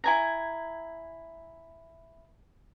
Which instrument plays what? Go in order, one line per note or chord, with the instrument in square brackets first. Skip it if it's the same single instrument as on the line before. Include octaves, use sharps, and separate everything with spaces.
[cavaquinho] E4 G#5 A#5